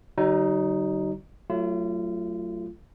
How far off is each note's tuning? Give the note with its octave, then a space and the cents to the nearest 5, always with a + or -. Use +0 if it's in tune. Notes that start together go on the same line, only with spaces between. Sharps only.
D3 +0 F#3 +45 D#4 +0
F#3 +0 A3 +5 F4 -35